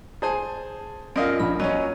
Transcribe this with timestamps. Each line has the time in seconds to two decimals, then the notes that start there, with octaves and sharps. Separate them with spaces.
0.22 G#4 C5 G#5 A5
1.16 F#2 F4 A#4 D5 D#5 F5
1.40 A#1 B5
1.60 F#3 C#4 D#5